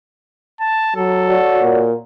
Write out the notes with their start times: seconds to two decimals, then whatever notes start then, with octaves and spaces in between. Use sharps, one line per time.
0.61 A5
0.96 F#3 A4
1.29 F#4 C#5 D5
1.61 A#2